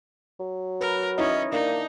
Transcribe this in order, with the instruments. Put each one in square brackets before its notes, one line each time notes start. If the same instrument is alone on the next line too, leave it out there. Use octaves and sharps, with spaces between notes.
[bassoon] F#3
[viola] A#4 [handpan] B4
[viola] C#4 [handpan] D#4 E4 D#5
[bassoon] A#3 [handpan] D4 [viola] D#4